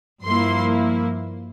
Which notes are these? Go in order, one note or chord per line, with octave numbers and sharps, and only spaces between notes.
G2 F3 A#3 E4 C6